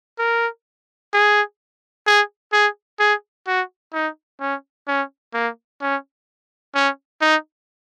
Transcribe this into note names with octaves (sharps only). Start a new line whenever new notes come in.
A#4
G#4
G#4
G#4
G#4
F#4
D#4
C#4
C#4
A#3
C#4
C#4
D#4